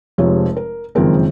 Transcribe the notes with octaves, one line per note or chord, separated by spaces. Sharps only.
F1 F2 C3 F3 G#3 C#5
A#4
F#1 F2 D#3 G#3 C4 A#4